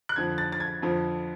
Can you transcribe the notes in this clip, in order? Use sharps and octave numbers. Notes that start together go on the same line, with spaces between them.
F#6
F2 D3 F3 G#6
A6
A6
G#6
F2 D3 F3